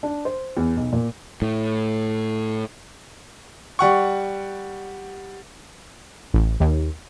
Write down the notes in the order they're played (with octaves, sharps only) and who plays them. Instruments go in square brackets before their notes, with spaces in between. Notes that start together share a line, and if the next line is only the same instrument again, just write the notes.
[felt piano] D4
C5
E2
B1
A#2
[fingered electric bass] A2
[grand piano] G3 F#5 C#6
[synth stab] A1
D#2